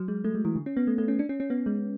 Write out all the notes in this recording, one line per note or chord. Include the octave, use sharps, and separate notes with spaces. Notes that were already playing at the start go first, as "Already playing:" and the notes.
Already playing: F#3
G#3
A3
G#3
E3
D3
C#4
B3
A3
A3
C#4
D4
C#4
C#4
B3
G#3